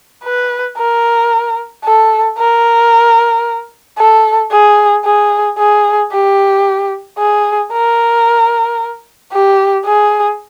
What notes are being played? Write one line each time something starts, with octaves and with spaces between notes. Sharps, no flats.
B4
A#4
A4
A#4
A4
G#4
G#4
G#4
G4
G#4
A#4
G4
G#4